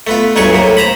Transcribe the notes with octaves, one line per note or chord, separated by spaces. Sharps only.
A3 B3 F4
C#2 G2 F#3 A3 G#4 C#6
A2 C3 A#3
C5 A#5 B5